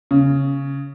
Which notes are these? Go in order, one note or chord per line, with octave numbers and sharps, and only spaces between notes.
C#3